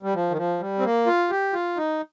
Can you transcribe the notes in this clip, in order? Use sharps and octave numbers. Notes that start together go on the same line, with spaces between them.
G3
F3
D#3
F3
G3
C4
A#3
F4
G4
F4
D#4